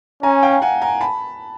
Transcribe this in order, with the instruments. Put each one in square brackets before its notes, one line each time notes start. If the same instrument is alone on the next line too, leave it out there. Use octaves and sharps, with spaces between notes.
[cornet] C#4 [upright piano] G#5 A#5
[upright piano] F5 G5
F#5 G#5
G#5 A#5
A5 B5